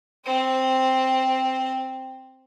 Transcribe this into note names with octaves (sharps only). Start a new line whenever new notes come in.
C4 C5